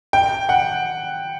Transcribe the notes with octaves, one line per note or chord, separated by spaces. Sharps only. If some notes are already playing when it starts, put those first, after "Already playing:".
G5
F#5